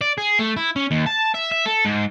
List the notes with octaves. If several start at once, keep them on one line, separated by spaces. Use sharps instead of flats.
D5
G#4
A3
E4
C#4
D#2
A5
E5
E5
A4
G#2